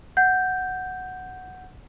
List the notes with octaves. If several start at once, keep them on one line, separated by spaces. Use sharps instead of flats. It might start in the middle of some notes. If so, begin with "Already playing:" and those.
F#5 G6